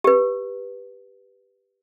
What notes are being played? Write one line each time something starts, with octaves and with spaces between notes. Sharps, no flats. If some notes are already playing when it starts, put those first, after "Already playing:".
G4 B4